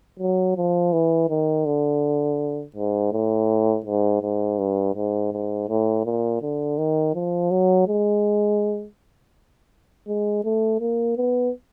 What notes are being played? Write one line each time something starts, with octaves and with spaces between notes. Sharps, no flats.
F#3
F3
E3
D#3
D3
G#2
A2
G#2
G#2
G2
G#2
G#2
A2
A#2
D3
D#3
F3
F#3
G#3
G#3
A3
A#3
B3